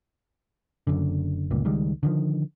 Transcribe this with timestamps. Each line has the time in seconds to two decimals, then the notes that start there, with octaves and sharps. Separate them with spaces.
0.87 F#1 F#2 D3
1.50 G1 C#2 A#2
1.65 C#2 D#3 G3 G#3
2.03 D3 D#3 F3